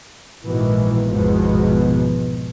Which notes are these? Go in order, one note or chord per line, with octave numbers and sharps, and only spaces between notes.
A#1 G#2 B2 D#3 E3
G#1 E2 G#2 B2 F3 G#3